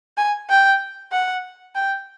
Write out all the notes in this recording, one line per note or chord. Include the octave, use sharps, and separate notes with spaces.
G#5
G5
F#5
G5